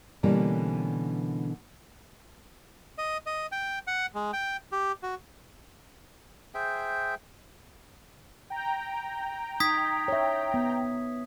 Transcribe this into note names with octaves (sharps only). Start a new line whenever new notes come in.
B2 D3 E3 G3 A#3 C#4
D#5
D#5
G5
F#5
G#3
G5
G4
F#4
G#4 C5 E5 G5
G5 A#5
D#4 D#6 G#6 B6
C#5 E5
B3